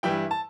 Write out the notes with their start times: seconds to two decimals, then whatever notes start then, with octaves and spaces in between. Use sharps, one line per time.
0.03 G2 E3 G3 E4 G5
0.31 A5